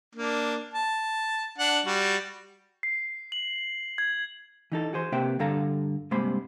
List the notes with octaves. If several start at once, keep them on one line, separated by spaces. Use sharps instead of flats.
A#3 D4
A5
D4 F#5
G3 F#4
C7
F#7
G#6
E3 D#4 A4
F#4 G#4 C5
C3 A#3 B4 C5 E5 G5
G2 D3 A4 F5 A#5
G2 C3 G#3 A#3 C5 B5